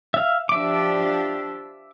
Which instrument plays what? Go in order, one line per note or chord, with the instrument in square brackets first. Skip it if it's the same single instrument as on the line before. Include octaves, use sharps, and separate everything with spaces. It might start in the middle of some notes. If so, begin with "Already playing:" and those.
[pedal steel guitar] E5 F5
[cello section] F3 D4 G4 [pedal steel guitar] E5 D6